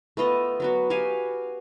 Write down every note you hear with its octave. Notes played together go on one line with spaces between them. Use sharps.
A3 B3 F4 D#5
F#3 B3 F#4
F#4 G4 F5 G#5